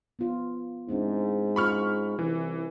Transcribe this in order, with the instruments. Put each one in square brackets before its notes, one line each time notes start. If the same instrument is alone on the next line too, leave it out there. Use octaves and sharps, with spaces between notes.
[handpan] B3 F4
[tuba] G#2 [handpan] C4 D4 E4
[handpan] C#4 F4 F#4 [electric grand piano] B5 C#6 F6
[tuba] C2 [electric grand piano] E3